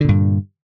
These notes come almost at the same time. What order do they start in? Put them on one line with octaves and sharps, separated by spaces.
D3 A#2 G2